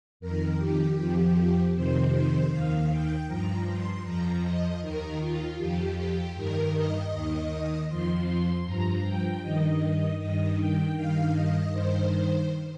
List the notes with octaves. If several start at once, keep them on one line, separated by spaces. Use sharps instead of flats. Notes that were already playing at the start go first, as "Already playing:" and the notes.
F2 D#3 A#4
G4
F2 F3
F2 C3 D#3 C5
C5
D#2 D#3 F5
G5
G2 F3 A#5
C6
F2 F3 A#5
D#5
D#2 D#3 A#4
F4
F2 F3 G4
G4
G2 D#3 A#4
D#5
D#2 D#3
F2 F3 C6
G2 F3 A#5
G5
G2 D#3 D#5
G2 D#3 D#5
G5
G2 D#3 F5
D#5
G2 D#3 C5